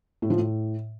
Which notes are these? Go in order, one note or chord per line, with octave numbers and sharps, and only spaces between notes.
A2
F3
A2